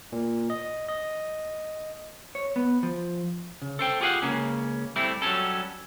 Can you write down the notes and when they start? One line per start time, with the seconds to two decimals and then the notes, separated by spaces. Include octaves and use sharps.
0.12 A#2
0.50 D#5
0.89 D#5
2.35 C#5
2.56 B3
2.83 F3
3.62 C#3
3.79 A4 C5 G5
4.01 F4 G4 G#4 B4 F5 F#5
4.22 C#2 C#3 A#3 C#4
4.96 G3 A3 C4 E4
5.22 F#3 G3 A3 C#4 A4